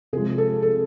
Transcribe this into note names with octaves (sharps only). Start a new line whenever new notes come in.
C3 F3 G#3 G#4
A4
A4